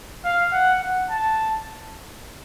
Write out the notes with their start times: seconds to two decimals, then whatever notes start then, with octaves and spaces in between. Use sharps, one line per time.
0.25 F5
0.53 F#5
0.81 F#5
1.10 A5